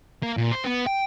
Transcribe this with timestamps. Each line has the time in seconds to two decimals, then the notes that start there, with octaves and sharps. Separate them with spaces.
0.23 A#3
0.37 A#2
0.52 C5
0.64 B3
0.87 G5